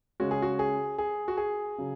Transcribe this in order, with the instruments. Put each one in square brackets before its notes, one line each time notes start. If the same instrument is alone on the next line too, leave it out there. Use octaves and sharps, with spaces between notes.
[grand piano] C#3 G#3 C#4 F#4
G#4
F#4
G#4
G#4
F#4
G#4
C#3 F#3